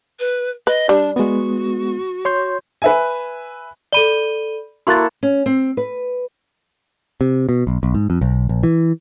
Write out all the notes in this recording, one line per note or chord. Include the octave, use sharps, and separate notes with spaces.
B4
B4 D#5
G3 D4
G#3 B3 F#4
C#5 C6 G6
B4 E5 G#5
A4 D5 B5 D#7 G7
A#3 E4 F#4 A4 C6 C#6 F#6 A6
C#4
C4
B4
C3
B2
B1
B1
G#2
F2
B1
A#1
E3